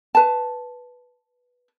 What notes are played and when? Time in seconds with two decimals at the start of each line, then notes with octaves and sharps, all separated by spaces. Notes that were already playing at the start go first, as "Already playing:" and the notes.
0.15 B4 A5